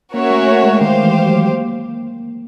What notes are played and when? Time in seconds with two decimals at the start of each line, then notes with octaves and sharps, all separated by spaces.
0.14 A#3 C#4 F#4 A#4 C#5 E5
0.31 A3
0.47 A3
0.64 G#3
0.81 D#3 G4 C5 F5
1.03 E3
1.25 F#3
1.48 A#3